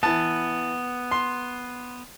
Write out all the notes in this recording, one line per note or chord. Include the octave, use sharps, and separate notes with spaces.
E3 B3 A5
C6